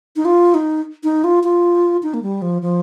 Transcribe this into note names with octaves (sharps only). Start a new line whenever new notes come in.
D#4
F4
D#4
D#4
F4
F4
D#4
A#3
G3
F3
F3